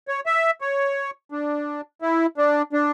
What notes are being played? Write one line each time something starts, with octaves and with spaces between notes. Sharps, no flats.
C#5
E5
C#5
D4
E4
D4
D4